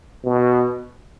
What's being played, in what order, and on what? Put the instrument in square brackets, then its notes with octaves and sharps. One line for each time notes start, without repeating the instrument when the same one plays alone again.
[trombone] B2